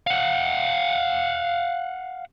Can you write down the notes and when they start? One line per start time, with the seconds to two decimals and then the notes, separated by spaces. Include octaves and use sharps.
0.07 F5 F#5